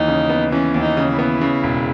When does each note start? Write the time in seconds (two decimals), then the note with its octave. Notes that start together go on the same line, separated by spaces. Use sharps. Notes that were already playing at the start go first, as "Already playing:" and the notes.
Already playing: D#2 E3 D#4
0.08 C#3
0.29 B3
0.52 E3 C#4
0.74 D#2
0.82 D#4
0.97 C#3
1.11 E4
1.19 B3
1.41 C#3
1.63 E1